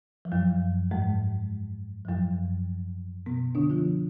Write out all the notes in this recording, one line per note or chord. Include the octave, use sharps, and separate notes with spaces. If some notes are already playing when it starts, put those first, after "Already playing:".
F3
F#2 F#3
G#2 G#3
F3
F#2 F#3
B2 B3
D3 D4
F3 F4